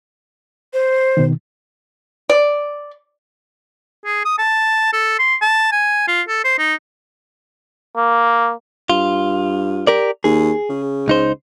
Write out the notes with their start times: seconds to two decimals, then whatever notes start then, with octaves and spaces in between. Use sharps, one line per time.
0.73 C5
1.17 B2 D#3
2.30 D5
4.05 G#4
4.25 D#6
4.39 A5
4.93 A4
5.19 C6
5.42 A5
5.72 G#5
6.08 F4
6.28 A4
6.44 C5
6.58 D#4
7.97 A#3
8.90 G2 F4
9.87 G4 A#4 D5
10.24 D#2 G#4
10.69 C#3
11.08 C#2 D#4 C5